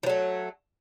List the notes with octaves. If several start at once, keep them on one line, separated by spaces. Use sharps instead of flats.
F3 F#3 A3